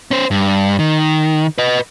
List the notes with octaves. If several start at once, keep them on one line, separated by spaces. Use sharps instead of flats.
C#4 C5
G2
D#3
B4 D#5